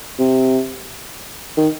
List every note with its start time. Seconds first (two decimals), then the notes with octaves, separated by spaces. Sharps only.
0.19 C3
1.57 D#3